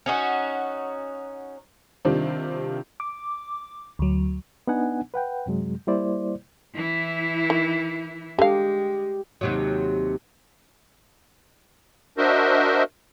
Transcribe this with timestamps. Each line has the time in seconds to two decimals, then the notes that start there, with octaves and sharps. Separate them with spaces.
0.06 C#4 D#4 F#4
2.05 C3 D#3 G3 C4 D4 F4
3.00 D6
3.99 D2 F#3
4.67 B3 D4 D#4 F#5 G#5
5.14 B4 F#5 G5
5.46 F#2 C3 F#3 G#3
5.87 G3 A#3 E4 C5 D5
6.75 E3 E4
7.50 D#3
8.39 D3 G#3 G4 F5
9.41 D#2 C3 F#3
12.18 D4 F#4 A#4 C5 D#5 E5